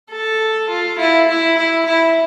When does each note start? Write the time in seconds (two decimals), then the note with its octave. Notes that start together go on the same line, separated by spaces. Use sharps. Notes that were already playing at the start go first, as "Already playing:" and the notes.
0.11 A4
0.69 F4
0.98 E4
1.27 E4
1.57 E4
1.85 E4